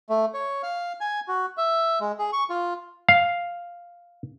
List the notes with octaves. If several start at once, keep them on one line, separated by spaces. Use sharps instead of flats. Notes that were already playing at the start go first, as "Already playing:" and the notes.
A3
C#5
F5
G#5
F#4
E5
G#3
G#4
C#6
F4
F5